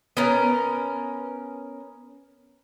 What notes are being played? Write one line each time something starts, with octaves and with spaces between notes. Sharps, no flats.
B3 C#4 A#4